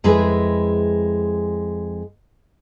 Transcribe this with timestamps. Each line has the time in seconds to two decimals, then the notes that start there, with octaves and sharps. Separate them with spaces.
0.04 F2 G#3 E4 G#4 B4